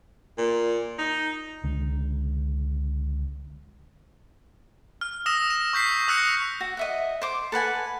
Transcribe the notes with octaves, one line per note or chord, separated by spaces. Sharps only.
A#2
D#4
C#2 D3 G#3
F6
D#6 E6 A#6 E7
E7
C#6 G6 B6 C7
D#6 E6 F#6 G6 A#6 C#7
F#4
D#5 E5 F#5
C5 D6
A4 B4 F#5 G#5